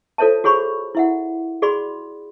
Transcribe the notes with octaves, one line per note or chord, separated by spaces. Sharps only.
F4 A4 C5 C#5 E5 A5
F#4 G#4 C#5 B5 C#6
E4 E5 F#5
F#4 G#4 D5 B5 C6